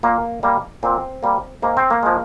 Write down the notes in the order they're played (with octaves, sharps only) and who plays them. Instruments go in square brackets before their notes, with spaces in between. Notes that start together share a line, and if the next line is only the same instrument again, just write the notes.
[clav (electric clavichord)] A#2 A#3
G3 A#3
A#2 C4
G3 A#3
G#2 A#3
C4
A#3
F3 G#3